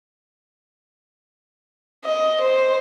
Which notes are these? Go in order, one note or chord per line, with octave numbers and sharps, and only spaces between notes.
D#5
C5